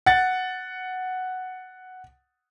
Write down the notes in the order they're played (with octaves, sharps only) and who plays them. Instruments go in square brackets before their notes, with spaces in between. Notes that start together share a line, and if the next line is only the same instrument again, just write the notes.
[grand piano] F#5 A6